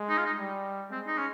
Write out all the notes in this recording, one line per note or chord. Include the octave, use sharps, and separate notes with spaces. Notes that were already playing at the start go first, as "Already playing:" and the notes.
Already playing: G#3
D#4
F4
D#4
G3
G#3 C4
D#4
C#4